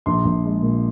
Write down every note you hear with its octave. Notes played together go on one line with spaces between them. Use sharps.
A#1 C6
A#1
G#3
A#2